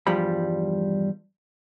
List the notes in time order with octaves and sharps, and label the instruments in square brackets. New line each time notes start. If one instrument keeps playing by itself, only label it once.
[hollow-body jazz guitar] E2 G2 F3 G3 B5